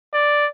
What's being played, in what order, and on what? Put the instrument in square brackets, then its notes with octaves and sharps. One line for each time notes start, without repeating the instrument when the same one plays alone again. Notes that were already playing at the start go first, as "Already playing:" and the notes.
[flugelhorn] D5